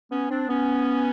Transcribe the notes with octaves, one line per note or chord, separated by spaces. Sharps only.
B3 C#4
C4 D4
B3 C#4